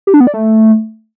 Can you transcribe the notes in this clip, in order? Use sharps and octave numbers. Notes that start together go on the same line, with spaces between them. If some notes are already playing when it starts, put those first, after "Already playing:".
G4
D4
B3
D5
A3